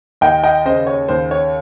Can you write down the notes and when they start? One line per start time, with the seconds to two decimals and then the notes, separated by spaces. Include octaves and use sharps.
0.21 D#2 D#5 G5
0.44 D#5 G5
0.66 C#3 C5 D#5
0.87 C#5
1.08 D#2 C5
1.31 C#5